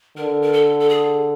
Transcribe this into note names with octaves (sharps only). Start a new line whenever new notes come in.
D3 A#4
A#4
A4
A4
G#4